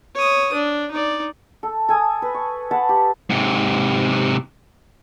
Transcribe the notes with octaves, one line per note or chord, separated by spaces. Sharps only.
C#5 D#6
D4
D#4 D5
A4
A4 G#5 D#6
B4
C#6
B4 F#5 A5
G4
G#2 C3